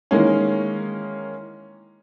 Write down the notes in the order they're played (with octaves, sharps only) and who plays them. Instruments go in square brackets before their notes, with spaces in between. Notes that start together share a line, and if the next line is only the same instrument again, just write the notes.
[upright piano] D#3 E3 G#3 A#3 C#4